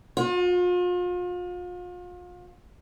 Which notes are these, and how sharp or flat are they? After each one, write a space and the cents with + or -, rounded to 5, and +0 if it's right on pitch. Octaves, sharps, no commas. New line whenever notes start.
F4 +40